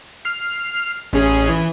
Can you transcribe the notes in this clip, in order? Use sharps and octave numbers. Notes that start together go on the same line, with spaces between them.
F6 C7
A1 C#4 G#4
E3